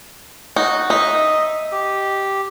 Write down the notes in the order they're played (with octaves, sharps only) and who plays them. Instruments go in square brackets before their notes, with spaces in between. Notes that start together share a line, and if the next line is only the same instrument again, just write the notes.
[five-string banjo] D#4 [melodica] F#4 F#5
[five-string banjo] D#4 [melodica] D#5 E5
[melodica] G4